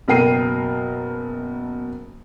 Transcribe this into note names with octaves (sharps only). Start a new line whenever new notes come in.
F#1 B2 A#4 G5 C7 D#7